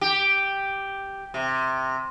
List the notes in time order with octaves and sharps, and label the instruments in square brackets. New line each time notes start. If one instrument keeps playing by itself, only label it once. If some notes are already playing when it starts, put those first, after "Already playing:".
[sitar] G4
C3